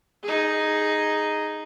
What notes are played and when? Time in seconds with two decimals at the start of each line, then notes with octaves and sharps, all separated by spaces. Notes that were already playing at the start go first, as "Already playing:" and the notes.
0.24 D#4 G#4